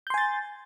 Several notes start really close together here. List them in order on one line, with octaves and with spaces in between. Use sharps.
G6 C6 G#5 A6